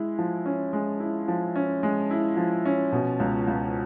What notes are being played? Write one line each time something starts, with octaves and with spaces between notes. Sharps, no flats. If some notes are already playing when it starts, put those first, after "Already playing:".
Already playing: G#3 E4
F3
C#4
G#3
E4
F3
C#4
G#3
E4
F3
C#4
B2
C#2
C#2